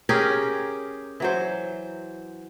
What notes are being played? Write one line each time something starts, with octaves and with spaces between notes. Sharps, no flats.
C#4 G4 G#4 A#4
E3 F#3 C5